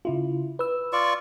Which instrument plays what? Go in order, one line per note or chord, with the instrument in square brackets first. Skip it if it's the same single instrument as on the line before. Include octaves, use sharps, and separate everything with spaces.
[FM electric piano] C#3 E4 F4
B4 E6
[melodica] F4 D5 C#6